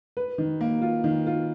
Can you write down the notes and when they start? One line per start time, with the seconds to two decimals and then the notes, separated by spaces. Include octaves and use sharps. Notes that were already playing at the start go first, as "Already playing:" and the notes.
0.17 B4
0.38 D#3
0.61 A#3
0.82 F4
1.04 D#3
1.26 F4